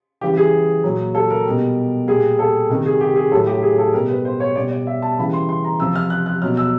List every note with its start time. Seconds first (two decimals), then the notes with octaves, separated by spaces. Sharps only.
0.21 C#3 E3 G3 G4
0.37 G#4
0.84 A#2 F#3
1.15 A4
1.30 A#4
1.46 B2 G3
2.08 A#2 G3 G#4
2.39 A4
2.70 C3 D#3 G3 A#4
2.86 G#4
3.00 G4
3.16 G#4
3.32 A2 A4
3.35 F#3
3.47 G4
3.62 G#4
3.78 A4
3.94 B2 G3 A#4
4.09 B4
4.25 C5
4.40 C#5
4.56 B2 G3 D5
4.72 D5
4.87 E5
5.02 A5
5.18 C#3 E3 G3 B5
5.33 C6
5.49 C6
5.64 A#5
5.80 C3 F3 E6
5.96 F6
6.10 F#6
6.26 F#6
6.42 B2 F#3 F6
6.57 E6